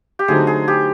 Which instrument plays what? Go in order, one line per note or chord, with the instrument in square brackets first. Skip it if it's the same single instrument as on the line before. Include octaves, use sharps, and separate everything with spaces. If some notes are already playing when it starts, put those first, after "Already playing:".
[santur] G4
[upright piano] D3 F#3 A3 C4 D#4 [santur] G#4
[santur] G#4
G4